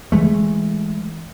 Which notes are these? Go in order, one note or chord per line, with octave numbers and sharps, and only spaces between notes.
E3 G#3 A3